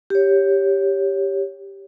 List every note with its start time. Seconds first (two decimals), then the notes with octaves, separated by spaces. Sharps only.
0.10 G4 C#5